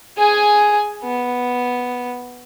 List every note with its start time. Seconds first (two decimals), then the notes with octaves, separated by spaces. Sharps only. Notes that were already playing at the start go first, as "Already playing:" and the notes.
0.18 G#4 G#5
1.04 B3